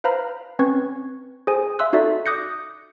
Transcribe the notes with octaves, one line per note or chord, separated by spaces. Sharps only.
B4 C5 F5 A#5 B5 F6
C4 C#4 B4 C#6 G#6
G#4 C5 G#5
E5 F5 C6 E6 F#6
D#4 F#4 A4 D5 E5
D6 D#6 F#6 G6 A#6 C#7